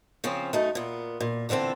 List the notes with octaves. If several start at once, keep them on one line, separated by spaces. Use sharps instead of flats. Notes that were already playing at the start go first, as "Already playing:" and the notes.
C#3 F3 C4 C#4
F#2 A3 D#4
A#2 B3
A#2
A#2 D3 E3 C4 A4